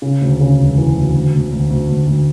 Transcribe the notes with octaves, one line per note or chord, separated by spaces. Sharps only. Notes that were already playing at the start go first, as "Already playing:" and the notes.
C#3
D2
C#3
E1
E3
D2
D2
D2
D2
D2
D2
D2